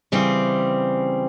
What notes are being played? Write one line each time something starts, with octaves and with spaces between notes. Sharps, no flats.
C#3 E3 G3 C4